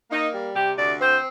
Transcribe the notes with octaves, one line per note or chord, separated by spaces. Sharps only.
A#3 D#4
G3
C3 G4
D2 D5
C4 C5